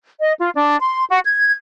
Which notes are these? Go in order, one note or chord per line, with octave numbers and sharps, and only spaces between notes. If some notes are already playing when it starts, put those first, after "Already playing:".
D#5
F4
D4
C6
F#4
G#6